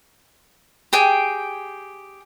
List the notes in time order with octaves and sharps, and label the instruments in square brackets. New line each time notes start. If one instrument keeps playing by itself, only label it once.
[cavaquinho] G4 G#4 G5